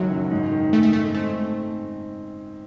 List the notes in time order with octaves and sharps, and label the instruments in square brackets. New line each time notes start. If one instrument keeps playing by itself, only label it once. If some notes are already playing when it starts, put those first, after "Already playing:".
Already playing: [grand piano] F#1 C#2 F#2 D#3 [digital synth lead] F#3
[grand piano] F#1
G#2
D#3
[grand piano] G#3 [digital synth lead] A3
[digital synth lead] A3
[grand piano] G#2 [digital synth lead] A3
[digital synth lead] A3 [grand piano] C4
[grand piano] G#2